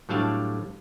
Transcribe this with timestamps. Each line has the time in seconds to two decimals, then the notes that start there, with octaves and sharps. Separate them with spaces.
0.09 A2 F#3 G3 D4 F5 A5